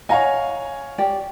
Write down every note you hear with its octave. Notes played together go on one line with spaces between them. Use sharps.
C#5 D#5 F5 F#5 G#5 A#5
G4 D5